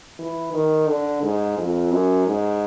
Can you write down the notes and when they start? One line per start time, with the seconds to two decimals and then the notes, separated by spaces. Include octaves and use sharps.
0.19 E3
0.53 D#3
0.88 D3
1.23 G#2
1.58 F2
1.92 F#2
2.27 G#2